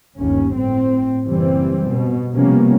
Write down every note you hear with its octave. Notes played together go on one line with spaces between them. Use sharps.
G1 D#2 C#4
A2 C4
F#1 E3 G3 C4
B2
C3 F3 G3 A#3 B3 C#4